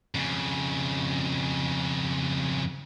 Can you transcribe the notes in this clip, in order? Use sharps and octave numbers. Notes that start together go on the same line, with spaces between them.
F2 C#3